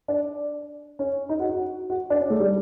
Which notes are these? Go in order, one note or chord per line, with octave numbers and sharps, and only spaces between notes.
D4
C#4
D#4
F#4
F#4
F#4
D4
C#4
A3
G3